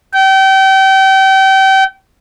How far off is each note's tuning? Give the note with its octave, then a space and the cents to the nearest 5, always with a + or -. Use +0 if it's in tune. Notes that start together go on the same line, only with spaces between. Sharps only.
G5 -30